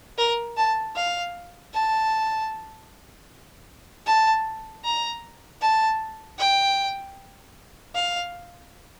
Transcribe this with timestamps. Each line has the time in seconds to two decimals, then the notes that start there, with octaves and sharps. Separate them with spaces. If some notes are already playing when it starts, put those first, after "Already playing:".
0.18 A#4
0.57 A5
0.96 F5
1.74 A5
4.06 A5
4.84 A#5
5.62 A5
6.39 G5
7.95 F5